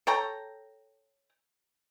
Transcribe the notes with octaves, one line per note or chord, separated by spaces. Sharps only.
A4 C#5 G5 A#5